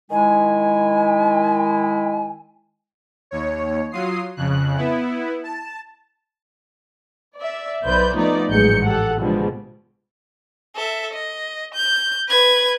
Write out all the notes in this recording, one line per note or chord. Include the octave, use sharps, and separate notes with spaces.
D#3 G#3 E4 G#5
D#2 C#5
F#3 F4 D#6 C7
F2 C#3 F#6
B3 E4
A5
D5 E5
B1 B4 C5 D5 G6
F3 A3 B3 D#4 F4 D5
A1 G#2 F#3 G#4 G6 C#7
G4 A4 F#5
B2 D3 F3 G3 G#3
A4 E5
D#5
G6
B4 G#6